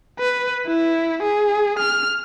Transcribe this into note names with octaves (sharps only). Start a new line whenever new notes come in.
B4
E4
G#4
F6